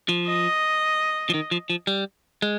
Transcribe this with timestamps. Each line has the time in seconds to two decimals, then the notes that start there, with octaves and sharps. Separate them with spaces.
0.09 F3
0.27 D#5
1.30 F3
1.34 D#3
1.51 F3
1.70 F3
1.87 G3
2.42 G#3